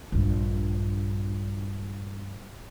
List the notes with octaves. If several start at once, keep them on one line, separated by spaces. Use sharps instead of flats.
A#1 G2